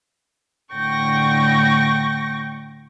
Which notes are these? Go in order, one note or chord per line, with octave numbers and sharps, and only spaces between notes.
A2 D3 G5 C#6 A#6